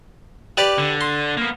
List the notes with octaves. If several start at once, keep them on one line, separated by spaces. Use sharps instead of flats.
G4 B4 D5
D3
C6
A#3 B3